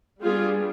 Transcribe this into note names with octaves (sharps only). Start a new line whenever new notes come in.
G3 B3 D4 F4 G#4